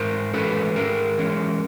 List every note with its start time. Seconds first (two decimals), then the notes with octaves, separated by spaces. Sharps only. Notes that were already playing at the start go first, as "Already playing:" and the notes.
Already playing: G#2 A#4 C5
0.34 E3 G#3 C#4 A4 B4
0.76 G#2 G#4 A#4
1.18 E3 G#3 C#4